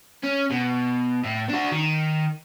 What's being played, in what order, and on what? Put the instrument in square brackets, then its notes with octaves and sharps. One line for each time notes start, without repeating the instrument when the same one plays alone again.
[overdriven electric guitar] C#4
B2
A2
D4 F#4
D#3